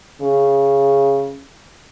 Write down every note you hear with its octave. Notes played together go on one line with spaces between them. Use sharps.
C#3